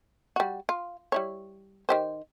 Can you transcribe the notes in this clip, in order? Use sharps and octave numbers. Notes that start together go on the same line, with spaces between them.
G3 F#4
F4
G3 E4 C#5
D#3 G4 C5